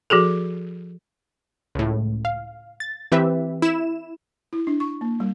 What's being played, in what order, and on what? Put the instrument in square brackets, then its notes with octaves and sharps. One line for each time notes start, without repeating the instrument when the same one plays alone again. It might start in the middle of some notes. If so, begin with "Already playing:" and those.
[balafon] F3 F#4 G#4 A4
[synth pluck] C#2 A2
F5
A6
E3 C4 G4 B4 E5
E4 E7
[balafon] E4
D4
C#6
A#3
G3